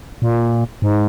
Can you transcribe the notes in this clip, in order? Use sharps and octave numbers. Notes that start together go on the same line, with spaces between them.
A#2
G#2